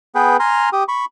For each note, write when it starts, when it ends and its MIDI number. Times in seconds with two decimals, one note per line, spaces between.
0.15 0.37 59
0.15 0.37 68
0.15 0.37 71
0.15 0.37 79
0.40 0.69 80
0.40 0.69 82
0.40 0.69 84
0.40 0.69 89
0.73 0.84 67
0.73 0.84 87
0.88 1.05 83
0.88 1.05 85